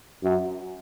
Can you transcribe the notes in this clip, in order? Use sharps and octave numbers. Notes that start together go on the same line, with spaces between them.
F#2